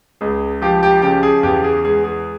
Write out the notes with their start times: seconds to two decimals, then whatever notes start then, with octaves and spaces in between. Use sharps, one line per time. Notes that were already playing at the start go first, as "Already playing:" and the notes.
0.21 C#2 G#4
0.62 F3 G4
0.83 G4
1.02 C#3 G4
1.23 G#4
1.43 E2 G4
1.64 G#4
1.84 G#3 G#4
2.04 G#4